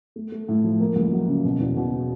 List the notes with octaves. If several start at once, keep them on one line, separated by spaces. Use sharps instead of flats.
A3
A3
A2
F3
A#3
C#2
F#3
C#3
B2
E2
B2